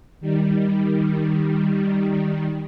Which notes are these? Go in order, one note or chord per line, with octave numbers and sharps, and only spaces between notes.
D#3 G3